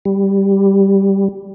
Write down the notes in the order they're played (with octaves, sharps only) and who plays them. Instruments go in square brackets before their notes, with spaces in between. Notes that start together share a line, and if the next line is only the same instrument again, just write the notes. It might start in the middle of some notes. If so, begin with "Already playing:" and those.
[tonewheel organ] G3